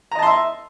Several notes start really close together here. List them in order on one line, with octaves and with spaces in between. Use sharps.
A#5 D#5 A5 C6 E5